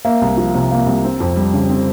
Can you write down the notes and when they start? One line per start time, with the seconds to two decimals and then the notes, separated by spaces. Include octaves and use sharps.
0.05 A#3 E5
0.22 C2
0.37 F3
0.55 C3
0.71 A#3
0.87 C2
1.04 C4
1.20 F2
1.36 G3
1.53 C#3
1.70 C4